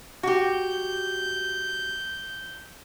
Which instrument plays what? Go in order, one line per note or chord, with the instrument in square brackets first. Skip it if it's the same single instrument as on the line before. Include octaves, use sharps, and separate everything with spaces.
[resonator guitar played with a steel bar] F#4 G4 [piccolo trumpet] G6